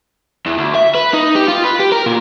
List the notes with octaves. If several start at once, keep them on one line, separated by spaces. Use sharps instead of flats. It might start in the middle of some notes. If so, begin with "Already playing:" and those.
E2
D2
E5
B4
D#4
G4
F4
B4
G4
A#4
A#2